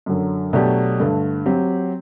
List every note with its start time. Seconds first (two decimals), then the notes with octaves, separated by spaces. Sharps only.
0.06 F#2 D3 F#3
0.53 B2 F#3 A3 D4 G4
1.00 G2 D3 A3
1.46 F#3 C4 G4